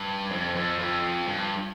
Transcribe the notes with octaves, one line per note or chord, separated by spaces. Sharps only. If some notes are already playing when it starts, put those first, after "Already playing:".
Already playing: G2
F2
F2
F2
G2